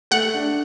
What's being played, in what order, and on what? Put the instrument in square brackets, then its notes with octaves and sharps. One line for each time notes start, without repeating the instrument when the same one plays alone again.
[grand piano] A3 [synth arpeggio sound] F#5
[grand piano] D4